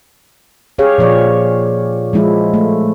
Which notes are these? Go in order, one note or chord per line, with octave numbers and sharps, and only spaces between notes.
G4 G#4 C#5 F5
A#2 F3 C#5 D5
F3 G#3 E4
A3